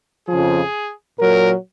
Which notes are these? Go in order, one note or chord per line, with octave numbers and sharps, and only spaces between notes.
F2 C#3 F3 G#4
A#2 F#3 A#4